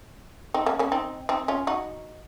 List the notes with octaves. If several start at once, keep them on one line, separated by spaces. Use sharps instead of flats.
C4 D#4
A#3 C#4
A#3 C#4
C4 D#4
C4 D#4
C#4 F4
D#4 F#4